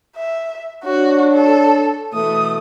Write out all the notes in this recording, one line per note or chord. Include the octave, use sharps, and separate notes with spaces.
E5
D4 F#4 C#5
A4
B2 E3 A3 D#6